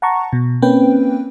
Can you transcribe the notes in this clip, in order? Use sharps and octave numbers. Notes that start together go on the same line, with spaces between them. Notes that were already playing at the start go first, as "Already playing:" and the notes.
F#5 A5 A#5 C#6
B2
A#3 C4 C#4 B4 G5